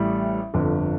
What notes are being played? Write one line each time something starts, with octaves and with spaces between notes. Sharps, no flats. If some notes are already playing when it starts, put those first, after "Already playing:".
Already playing: A1 A2 G3
G1 F2 D3